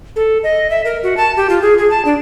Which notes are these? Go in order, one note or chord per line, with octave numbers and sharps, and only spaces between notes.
A4
D#5
E5
A#4
F#4
A5
G4
F4
G#4
G#4
A5
D4